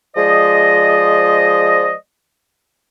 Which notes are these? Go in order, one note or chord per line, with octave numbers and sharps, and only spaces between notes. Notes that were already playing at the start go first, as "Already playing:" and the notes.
F3 G#3 C5 D5 D#5